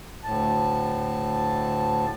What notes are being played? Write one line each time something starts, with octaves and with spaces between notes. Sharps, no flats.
D2 A2 A5